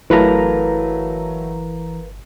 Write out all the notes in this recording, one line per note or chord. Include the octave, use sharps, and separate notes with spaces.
G1 E3 F#3 A3 A#4 B4 F5 A#5